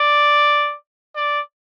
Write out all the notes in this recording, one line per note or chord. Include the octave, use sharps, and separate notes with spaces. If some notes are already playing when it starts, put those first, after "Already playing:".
Already playing: D5
D5